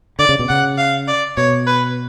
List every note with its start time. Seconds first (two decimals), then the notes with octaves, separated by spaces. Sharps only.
0.19 D3 D5
0.29 C#3
0.39 B2
0.49 C#3 F#5
0.78 F5
1.08 D5
1.37 B2 C#5
1.67 B4